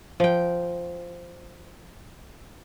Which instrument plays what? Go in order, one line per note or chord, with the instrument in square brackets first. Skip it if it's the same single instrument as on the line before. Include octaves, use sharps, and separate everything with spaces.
[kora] F3 G5